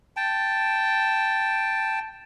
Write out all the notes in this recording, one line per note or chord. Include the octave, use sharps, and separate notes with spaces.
G5 A5